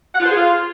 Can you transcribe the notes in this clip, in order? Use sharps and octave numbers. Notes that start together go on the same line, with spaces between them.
F#5
F4
C5
G#4
F4